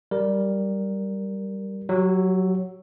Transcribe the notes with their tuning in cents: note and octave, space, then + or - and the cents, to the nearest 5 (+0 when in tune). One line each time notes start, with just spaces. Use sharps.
G3 -5 A#4 +0
F#3 +0 G4 -30 E6 +0